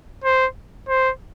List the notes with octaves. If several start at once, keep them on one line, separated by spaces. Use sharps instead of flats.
C5
C5